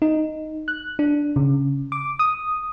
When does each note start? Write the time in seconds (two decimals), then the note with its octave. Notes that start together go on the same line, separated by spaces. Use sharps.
0.02 D#4
0.68 F#6
0.99 D4
1.36 C#3
1.92 D6
2.19 D#6